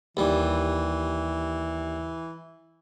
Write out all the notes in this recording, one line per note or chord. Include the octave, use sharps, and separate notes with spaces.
D#2 E3 G3